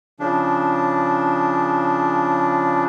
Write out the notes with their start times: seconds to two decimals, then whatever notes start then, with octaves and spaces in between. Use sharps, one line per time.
0.20 C#3 F3 D4